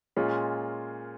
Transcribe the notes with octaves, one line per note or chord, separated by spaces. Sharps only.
A#2 G#3 C#4 F4